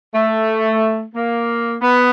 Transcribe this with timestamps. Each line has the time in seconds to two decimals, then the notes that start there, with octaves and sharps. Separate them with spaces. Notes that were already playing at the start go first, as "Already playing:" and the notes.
0.14 A3
1.15 A#3
1.82 B3